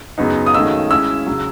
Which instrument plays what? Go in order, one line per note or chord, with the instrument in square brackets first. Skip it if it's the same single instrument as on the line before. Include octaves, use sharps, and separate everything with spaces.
[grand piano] F#2 C#3 F#3 B3 D#4
[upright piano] D#6
[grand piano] D#3 A3 C#4 G#4 D#5 [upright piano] E6
[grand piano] G#3 C#4 E4 [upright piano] E6
[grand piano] C#3 F#3